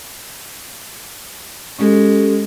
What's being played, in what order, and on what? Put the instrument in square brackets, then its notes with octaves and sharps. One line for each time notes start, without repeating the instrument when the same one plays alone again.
[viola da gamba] G#3 [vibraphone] C#4 G4 A4